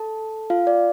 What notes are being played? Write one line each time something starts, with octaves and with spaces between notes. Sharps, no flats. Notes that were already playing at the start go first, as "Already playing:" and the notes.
Already playing: A4 A5
F4 F5
D5